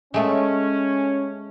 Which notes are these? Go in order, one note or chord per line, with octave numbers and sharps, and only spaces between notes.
G#3 A3 C#4 A4